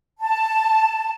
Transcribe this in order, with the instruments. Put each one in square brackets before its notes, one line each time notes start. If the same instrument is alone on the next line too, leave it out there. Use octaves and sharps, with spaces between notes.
[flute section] A5